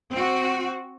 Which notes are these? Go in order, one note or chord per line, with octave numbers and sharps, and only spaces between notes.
C4 F#4